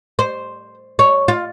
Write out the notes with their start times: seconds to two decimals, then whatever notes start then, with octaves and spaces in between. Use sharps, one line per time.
0.19 C5
0.99 C#5
1.28 F4